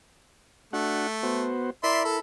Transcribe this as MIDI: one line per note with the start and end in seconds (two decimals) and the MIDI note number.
0.73 1.52 57
0.73 1.07 62
0.73 1.07 66
0.73 1.07 78
1.23 1.70 59
1.23 1.70 66
1.23 1.70 72
1.83 2.20 64
1.83 2.20 70
1.83 2.01 74
1.83 2.01 76
1.83 2.20 83
1.83 2.01 84
2.04 2.17 69